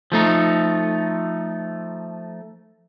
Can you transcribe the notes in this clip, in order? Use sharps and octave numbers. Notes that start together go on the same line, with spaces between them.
F3 A3 D#4